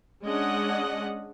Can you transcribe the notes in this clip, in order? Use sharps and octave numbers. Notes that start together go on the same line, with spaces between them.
G#3 C#4 D4 D#5 F#5